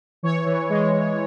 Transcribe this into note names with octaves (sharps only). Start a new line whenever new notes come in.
E3 C#5
E3
G#3
G#3